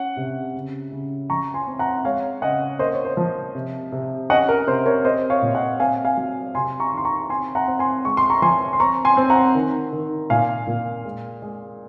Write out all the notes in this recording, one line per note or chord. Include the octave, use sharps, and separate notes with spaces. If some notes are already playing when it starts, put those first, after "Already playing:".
Already playing: C#4 F#5
C3
C#3
C#3
F3 A#5 C#6
G#5 C6
C4
F#5 A#5
G#3 C#5 F5
C#3 D#5 F#5
A#3 C5 D#5
C#5
C5
F3
C3
C3
C#4 D#5 F#5
A#4
C3 C5
A#4 C#5
C4 C5 D#5
C#5 F5
A#2
D#5 F#5
C4 F5 G#5
F5 G#5
F#3
C3 G#5 C6
A#5 C#6
D#3
C6
A#5 C#6
C4 G#5 C6
F#5 A#5
C4
G#5 C6
G#3 C#6
C6
A#5 C#6
F3 G#5 C6
C6
C4 A#5 C#6
G#5 C6
C4
F#5 A#5
D#3
D#3
A#2 F5 G#5
A#2
G#3
G#3